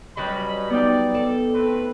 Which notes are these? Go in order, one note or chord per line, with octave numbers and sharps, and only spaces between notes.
F#3 G3 C#4 B4 D#5 B5
B3 D#4 D5 G5
A4
A3 C4 B4